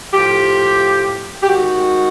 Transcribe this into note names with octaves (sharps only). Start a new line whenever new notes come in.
A2 F3 G4
G4
G#2 D#3 F#4